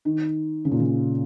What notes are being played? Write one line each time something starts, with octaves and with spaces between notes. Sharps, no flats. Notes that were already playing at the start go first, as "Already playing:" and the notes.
D#3
C#3
A#2
C#3